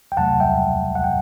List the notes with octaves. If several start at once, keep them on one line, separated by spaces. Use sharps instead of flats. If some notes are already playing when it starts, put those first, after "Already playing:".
G5
E2 C3 F#3 A3 F#5 A5
E5 G5
F#5
G5